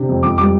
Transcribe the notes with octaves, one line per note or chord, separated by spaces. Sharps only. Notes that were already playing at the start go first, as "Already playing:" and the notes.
Already playing: C3 D4
F2
F2 D6
G3 D6